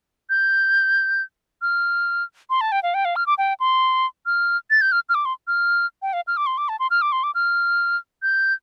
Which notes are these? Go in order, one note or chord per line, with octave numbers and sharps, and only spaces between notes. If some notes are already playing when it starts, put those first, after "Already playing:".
G6
F6
C6
A5
G5
F5
G5
F5
F6
D6
G5
C6
F6
A6
G6
F6
F6
D6
C6
F6
G5
F5
F6
D6
C6
D6
A5
C6
F6
D6
C6
D6
F6
G6